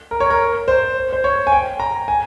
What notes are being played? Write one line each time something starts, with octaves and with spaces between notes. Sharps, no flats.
A#4
C#5
A#4
C5
C5
C#5
G#5
G5
A#5
G#5